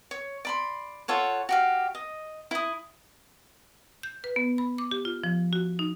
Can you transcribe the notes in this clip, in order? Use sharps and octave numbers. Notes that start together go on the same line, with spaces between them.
C#5
D5 B5 C6
F4 A4 C#5 F#5
F#4 G4 F5
D#5
E4 D#6
G6
B4
B3
B5
D6
G4
F4
F3
F#4
D#4